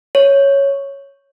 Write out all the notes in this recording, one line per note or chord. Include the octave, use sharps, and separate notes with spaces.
C#5